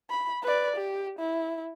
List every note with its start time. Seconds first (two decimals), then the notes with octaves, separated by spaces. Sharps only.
0.10 B5
0.43 B4 D5
0.76 G4
1.19 E4